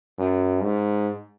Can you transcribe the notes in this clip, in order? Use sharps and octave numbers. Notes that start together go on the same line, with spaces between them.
F#2
G#2